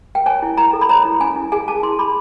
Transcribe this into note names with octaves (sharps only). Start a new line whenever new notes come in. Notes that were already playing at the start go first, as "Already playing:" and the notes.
G5
C#5 G#5
E4
E4 A#5
A4
B5
C#5 A#5
E4
C#4 G#5
E4
G#4 G#5
G#4 A5
E4 C6
G#4 B5